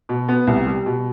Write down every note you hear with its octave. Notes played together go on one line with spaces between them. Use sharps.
B2
B3
C2
G3
B2